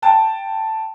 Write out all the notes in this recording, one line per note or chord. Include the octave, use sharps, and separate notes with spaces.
G5 A5